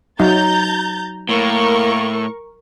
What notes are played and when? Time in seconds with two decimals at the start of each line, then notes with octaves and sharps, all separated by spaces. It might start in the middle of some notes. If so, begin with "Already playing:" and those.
0.20 F#3 D#4 A#5 G6 A6
1.29 A2 A#3 A#4 C#6